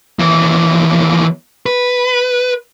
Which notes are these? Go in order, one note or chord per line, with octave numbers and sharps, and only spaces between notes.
D#2 E3
B4